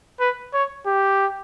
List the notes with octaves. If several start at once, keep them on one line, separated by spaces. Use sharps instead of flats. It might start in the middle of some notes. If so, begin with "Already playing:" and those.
B4
C#5
G4